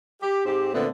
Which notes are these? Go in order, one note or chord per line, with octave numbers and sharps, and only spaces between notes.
G4
G#2 C4 G4
A#2 D3 A3 B3 C4